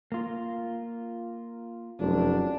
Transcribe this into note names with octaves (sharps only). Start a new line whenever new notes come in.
A#3 F4
F1 F#2 D4